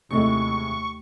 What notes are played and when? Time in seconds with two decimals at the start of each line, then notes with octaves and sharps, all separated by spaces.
0.11 D#2 C3 G#3 A3 E4 A4 D#5 C#6